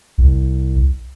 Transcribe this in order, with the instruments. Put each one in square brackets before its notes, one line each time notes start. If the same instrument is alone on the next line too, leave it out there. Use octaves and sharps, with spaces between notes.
[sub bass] C2